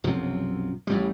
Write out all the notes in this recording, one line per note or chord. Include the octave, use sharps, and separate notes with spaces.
B1 F#2 C3 F3
A1 A2 G3